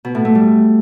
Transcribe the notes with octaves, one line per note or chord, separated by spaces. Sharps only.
B2
A2
A3
G3